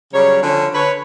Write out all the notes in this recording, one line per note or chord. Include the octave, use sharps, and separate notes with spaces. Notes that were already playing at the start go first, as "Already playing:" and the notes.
C#3 F#3 G3 C#5
D3 F3 C#4
D3 B4 C#5